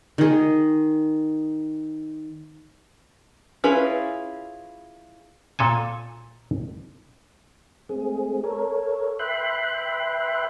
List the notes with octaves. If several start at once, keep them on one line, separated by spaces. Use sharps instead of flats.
D#3 G#4
C#4 E4 F4 G#4 B4
A#2 A4 G#5
G#3 A3 C4 G#4
A4 A#4 C#5
B4 E5 G5 B5 C6 F#6